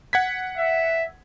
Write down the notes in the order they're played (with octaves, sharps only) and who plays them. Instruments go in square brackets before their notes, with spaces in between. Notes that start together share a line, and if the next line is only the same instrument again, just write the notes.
[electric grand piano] F#5 G#6 B6
[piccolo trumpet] E5